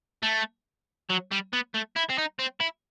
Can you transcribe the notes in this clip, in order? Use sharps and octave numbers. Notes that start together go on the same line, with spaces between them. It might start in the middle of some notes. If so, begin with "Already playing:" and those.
A3
F#3
G3
B3
A3
E4
C4
D#4
C4
E4